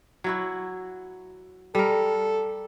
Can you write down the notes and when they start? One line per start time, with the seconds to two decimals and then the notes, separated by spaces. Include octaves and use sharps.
0.24 F#3 E4 F#4
1.75 G3 A4 A#4